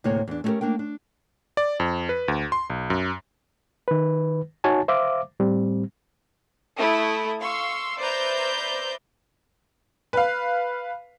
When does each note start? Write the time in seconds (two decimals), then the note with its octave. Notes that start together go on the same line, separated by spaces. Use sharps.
0.04 D2 A2 C3 A#3 C#5
0.27 E2 D4
0.44 A3 C#4 D#4 F#4 G4 A#4
0.61 A#3 D4 A#4 G5
0.79 D4
1.57 D5
1.80 F2
2.09 B4
2.28 D2
2.52 C6
2.70 B1
2.90 F#2
3.88 D#3 B4
4.64 D#4 F#4 C#5 G#5 A5
4.88 C5 E5 F5 D6
5.40 A2 G3 C4
6.77 A3 E4 D#6
7.40 F5 C6 C#6 E6
7.98 B4 C5 D5 E5 A#5 G6
10.13 B4 F5